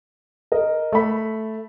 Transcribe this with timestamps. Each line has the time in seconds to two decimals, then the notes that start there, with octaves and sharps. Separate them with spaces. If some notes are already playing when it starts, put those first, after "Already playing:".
0.52 A#4 D#5
0.92 A3 B5